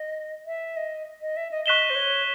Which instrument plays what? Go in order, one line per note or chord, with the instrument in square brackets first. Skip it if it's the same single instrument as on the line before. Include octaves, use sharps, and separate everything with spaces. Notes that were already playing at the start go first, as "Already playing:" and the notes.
Already playing: [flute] D#5
E5
D#5
D#5
E5
D#5
[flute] D#5 [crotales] C#6 F#6 B6 E7 G7
[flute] C5
C#5